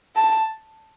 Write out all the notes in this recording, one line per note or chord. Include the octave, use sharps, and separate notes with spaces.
A5